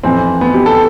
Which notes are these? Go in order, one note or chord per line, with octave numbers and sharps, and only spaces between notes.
F2 E3 C4
B3
G4
A4